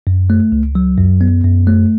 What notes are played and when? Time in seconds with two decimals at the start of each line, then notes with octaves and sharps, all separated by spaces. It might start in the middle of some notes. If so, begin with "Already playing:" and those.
0.07 F#2
0.30 A3
0.52 C#2
0.75 F#3
0.98 F#2
1.21 B3
1.44 F#2
1.67 A3